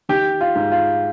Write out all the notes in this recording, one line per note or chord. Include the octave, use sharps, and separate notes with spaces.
D#3 G4
F4
G#2
F4